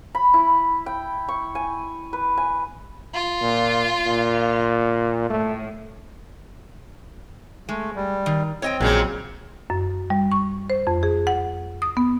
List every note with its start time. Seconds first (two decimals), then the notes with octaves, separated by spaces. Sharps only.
0.15 B5
0.34 E4
0.86 G5
1.28 C#6
1.55 G#5
2.13 B4
2.37 G#5
3.13 F4
3.41 A#2
4.06 A#2
5.30 A2 A3
7.69 G#3 A3
7.96 G3
8.26 D#3
8.62 C4 C#5 D#5 G5
8.81 A#1 A#2 C#3 F#3 G#3
9.70 F#2
10.10 G3
10.32 C#6
10.70 C5
10.87 F2
11.03 G#4
11.27 F#5
11.82 D#6
11.97 B3